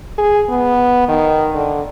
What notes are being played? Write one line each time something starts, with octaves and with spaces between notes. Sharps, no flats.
G#4
B3
D#3
D3